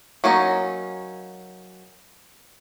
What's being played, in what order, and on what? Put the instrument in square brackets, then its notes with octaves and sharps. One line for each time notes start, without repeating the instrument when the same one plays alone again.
[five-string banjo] F#3 A#3 C#4 D#4